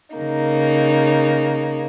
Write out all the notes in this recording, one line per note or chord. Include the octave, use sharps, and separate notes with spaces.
C#3 A#3 D#4